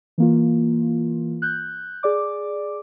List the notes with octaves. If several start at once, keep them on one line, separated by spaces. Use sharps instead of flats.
E3 A#3 F4
F#6 G6
G#4 D5 D6